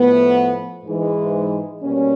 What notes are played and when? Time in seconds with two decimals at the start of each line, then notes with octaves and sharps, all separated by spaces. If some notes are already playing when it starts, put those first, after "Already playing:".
Already playing: A2 F3 A3 B3
0.85 G#2 E3 G#3
1.82 B2 G3 A#3 C#4